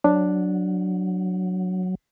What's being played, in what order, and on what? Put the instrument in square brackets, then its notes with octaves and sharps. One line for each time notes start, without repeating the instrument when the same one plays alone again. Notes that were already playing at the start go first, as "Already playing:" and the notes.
[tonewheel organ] F#3 [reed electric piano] D4